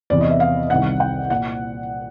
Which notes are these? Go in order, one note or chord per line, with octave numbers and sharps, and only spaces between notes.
E2 C3 E3 D5
D#5
E5
F5
C2 C3 D#3 F#5
G5
A#2 F#5